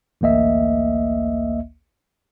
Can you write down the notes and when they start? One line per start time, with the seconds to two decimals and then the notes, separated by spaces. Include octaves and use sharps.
0.21 A1 D2 A#3 D#5 E5